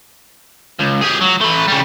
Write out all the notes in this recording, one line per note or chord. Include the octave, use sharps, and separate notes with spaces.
C#2
G4 G#4
F#3
A3 B4
C#3 G3